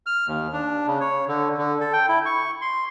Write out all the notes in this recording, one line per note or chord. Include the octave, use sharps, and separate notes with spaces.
F6
D#2
D4
C#3
C#5
D3
D3
A4
G5
E4
C#6
C6